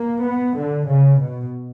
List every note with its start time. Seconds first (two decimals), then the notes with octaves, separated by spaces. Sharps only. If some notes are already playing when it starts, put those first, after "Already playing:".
Already playing: A#3
0.24 B3
0.56 D3
0.86 C#3
1.18 B2